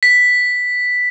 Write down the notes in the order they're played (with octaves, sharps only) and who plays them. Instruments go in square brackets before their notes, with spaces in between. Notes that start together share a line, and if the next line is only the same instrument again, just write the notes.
[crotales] B6